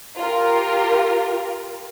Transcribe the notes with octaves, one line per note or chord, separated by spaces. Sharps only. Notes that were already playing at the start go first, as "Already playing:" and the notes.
F4 G4 A#4